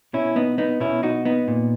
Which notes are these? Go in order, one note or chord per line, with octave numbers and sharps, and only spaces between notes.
B2 C#4 E4
B3 D#4
B3 D#4
B2 C#4 E4
D#4 F#4
B3 D#4
A#2